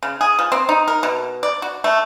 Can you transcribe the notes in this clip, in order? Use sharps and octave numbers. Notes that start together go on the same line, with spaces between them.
C#3
G#4
F3
C4
D#4
A#4
B2
D5
F#4
A3